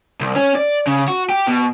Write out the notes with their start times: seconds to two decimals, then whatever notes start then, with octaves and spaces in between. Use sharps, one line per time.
0.21 C2
0.36 C#4
0.55 D5
0.87 C#3
1.08 F#4
1.29 G4
1.48 B2